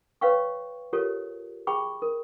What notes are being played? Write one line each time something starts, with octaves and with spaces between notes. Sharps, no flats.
B4 C#5 F5 G5 C#6
F4 G4 A4 A#4 C#5
G#4 G5 B5 C#6 D6
A#4